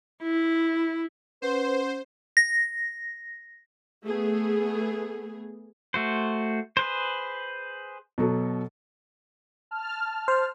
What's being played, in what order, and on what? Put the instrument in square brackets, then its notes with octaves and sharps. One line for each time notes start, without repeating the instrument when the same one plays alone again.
[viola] E4
[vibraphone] C#4 F#5 C6 [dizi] B4 [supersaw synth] C5
[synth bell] A#6
[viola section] A3 B3 G#4
[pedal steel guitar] A3 F#4 C5
G#4 B4 C5
[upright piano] B2 F#3 A4
[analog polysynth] A5 F6
[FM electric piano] C5